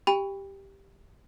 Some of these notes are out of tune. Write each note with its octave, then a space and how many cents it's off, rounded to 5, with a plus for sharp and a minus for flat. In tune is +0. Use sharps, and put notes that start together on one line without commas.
G4 +0 G5 +30 B5 +10